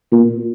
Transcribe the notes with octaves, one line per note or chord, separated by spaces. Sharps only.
A#2